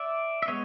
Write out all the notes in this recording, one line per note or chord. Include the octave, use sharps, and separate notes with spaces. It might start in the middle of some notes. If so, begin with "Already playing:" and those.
Already playing: D5 E5
E5
G#3 B3 C#5 D#5